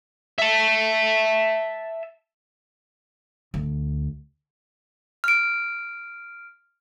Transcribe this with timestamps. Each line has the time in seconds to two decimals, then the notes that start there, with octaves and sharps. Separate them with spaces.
0.38 E5 A5
3.54 D2
5.24 F6 D7